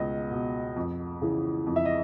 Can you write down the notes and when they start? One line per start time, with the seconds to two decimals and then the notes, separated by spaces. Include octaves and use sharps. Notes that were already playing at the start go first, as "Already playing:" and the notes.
Already playing: C#2 B2 D#5
0.31 B2
0.76 F2
1.21 C#3 E3
1.66 F2
1.76 E5
1.85 D#5